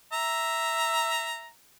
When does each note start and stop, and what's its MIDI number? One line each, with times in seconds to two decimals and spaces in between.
0.13 1.50 76
0.13 1.50 82